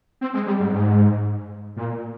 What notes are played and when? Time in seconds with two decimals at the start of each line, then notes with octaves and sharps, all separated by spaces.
0.21 C4
0.34 G#3
0.47 G3
0.60 G#2
0.73 G#2
1.77 A#2